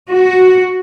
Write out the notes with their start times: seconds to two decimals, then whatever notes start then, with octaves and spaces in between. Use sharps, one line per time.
0.11 F#4